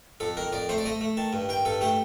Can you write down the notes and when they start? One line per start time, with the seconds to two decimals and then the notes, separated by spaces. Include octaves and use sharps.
0.20 F2 A4
0.37 D#3 A#4
0.53 F2 D5
0.69 A3 C5
0.78 D5
0.86 A3 D#5
1.01 A3
1.17 D#3 A5
1.33 G2
1.49 D#3 G5
1.65 G2 A4
1.81 A3 G4